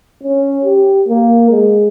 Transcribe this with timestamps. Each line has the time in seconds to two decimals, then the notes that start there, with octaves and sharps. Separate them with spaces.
0.23 C#4
0.64 G4
1.08 A#3
1.50 G#3